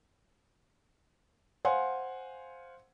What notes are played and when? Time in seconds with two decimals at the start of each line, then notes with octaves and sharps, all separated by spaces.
1.65 C5 F5 F#5 G#5 C6